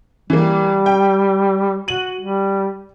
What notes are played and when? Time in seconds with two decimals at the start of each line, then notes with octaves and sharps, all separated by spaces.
0.30 E3 G3 A#3
0.86 G5
1.88 F#4 D#7 F#7
2.21 G3